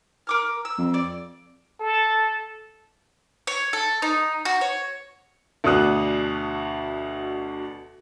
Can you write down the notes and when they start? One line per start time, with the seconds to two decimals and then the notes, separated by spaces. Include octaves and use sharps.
0.27 A#4 D6 F6
0.65 E6
0.78 F2
0.94 D5
1.80 A4
3.47 C#5
3.73 A4
4.02 D#4
4.45 F#4
4.61 C#5
5.64 D2 B2 D4 D#6 F#6